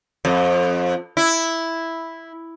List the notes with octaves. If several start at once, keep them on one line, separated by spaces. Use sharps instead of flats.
F2
E4